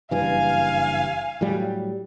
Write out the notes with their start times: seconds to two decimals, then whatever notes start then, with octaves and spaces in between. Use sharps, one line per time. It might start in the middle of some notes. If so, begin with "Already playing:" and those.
0.11 F#1 G2 E3 F5 G#5
1.41 A2 F#3 G3